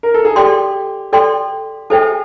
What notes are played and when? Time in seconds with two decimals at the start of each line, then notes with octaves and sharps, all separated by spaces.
0.03 A#4
0.14 A4
0.25 G#4
0.35 G4 A4 D5 G5 C6
1.13 A4 D5 G5 C6
1.90 G#4 A4 C5 E5 G5